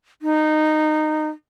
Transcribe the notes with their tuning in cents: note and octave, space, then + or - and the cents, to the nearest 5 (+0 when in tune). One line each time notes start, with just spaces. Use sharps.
D#4 -15